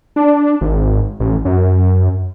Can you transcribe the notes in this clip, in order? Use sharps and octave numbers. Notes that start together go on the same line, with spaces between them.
D4
G#1
A1
F#2